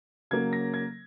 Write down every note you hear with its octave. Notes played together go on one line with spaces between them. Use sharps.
C#3 F#3 A#3 G#6
A#6
G#6